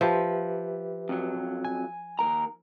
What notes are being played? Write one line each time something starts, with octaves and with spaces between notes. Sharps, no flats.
F3 G4 B4 E5
F2 F#3
G#5
D#2 A#4 A#5